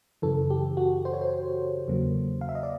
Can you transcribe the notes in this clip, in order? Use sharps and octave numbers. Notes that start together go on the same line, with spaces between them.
F#2 C#3 E3 A4
G4
F#4
C5
C#5
C5
E2 C#3 F#3 A#3
F5
E5
D#5
D5